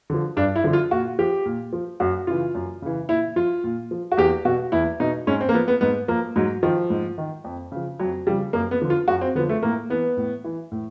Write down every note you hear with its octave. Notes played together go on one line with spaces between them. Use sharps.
D3 F3
G2 D4
E4
D3 F3
F4
A#2 F#4
F3 G4
A#2
F3
F#2 F#4
C#3 E3 F4
F#2
C#3 E3
A#2 E4
F3 F4
A#2
F3
F#4
E2 G4
B2 F#4
E2 E4
B2 D#4
G#2 C#4
C4
A#3
F3 B3
B3
G#2 B3
F3 A#3
G#2 F#3
D#3 F3
G#2
D#3
F2
C#3 F3
F2 F#3
C#3 F3 G3
F#2 A#3
B3
D3 F3
F4
F#2 F#4
C4
D3 F3 B3
A3
A2 A#3
E3 B3
A2
E3
A2